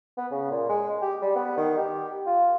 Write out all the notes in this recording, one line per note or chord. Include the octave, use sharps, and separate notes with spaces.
B3
C#3
A#2
G#3
G4
G3
B3
D#3
G4
F4